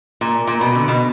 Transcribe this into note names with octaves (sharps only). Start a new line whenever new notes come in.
A#2
A#2
B2
D3
B2